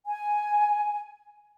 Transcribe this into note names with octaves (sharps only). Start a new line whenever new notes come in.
G#5